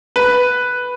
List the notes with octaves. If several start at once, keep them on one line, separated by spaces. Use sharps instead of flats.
B4